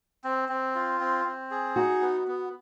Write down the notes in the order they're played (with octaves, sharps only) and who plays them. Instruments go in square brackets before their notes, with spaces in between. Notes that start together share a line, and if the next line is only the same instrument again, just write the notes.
[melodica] C4
C4
F4
C4
C4
G#4
[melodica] D#4 [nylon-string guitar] F#4
[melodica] B3
B3